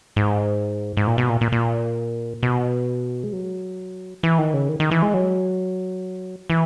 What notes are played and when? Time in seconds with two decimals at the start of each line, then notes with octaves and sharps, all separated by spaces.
0.16 G#2
0.97 G#2
1.07 A#2
1.18 B2
1.29 A#2
1.41 A#2
1.52 A#2
2.43 B2
3.24 G#3
3.33 F#3
4.23 E3
4.38 D#3
4.54 C#3
4.69 D#3
4.80 D#3
4.91 E3
5.02 G#3
5.14 F#3
6.50 E3